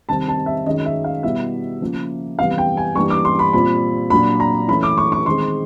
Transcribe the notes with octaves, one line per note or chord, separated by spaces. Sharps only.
C3 D#3 G3 C4 D#4 A5
A5
E5
F#2 D#3 G#3 C#4 D#5
E5
F5
B2 G3 B3 E4 E5
C#3 F3 A#3
C3 E3 G3 B3 F5
G5
G#5
G2 E3 G3 A#3 C#6
D6
C6
B5
A#2 G3 C4 F4 B5
A#2 F#3 A#3 D4 F4 B5
A#5
E3 A3 C#4 E4 B5
D6
C#6
C#6
D#3 G#3 C4 C6